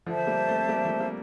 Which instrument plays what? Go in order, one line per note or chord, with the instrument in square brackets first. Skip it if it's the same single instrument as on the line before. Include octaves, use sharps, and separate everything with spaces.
[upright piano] D3 F3 [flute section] C5 E5 A5
[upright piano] G3 A#3
A3 C4
G3 A#3
F3 A3
G3 A#3